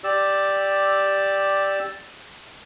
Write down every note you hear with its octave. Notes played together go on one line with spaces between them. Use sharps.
G4 D5 E6